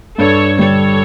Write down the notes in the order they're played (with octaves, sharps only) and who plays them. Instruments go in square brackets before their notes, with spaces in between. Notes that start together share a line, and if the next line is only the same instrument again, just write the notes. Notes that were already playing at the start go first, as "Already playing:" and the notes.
[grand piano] G2 [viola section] A4 C#5
[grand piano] D3 G3 [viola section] A4 C#5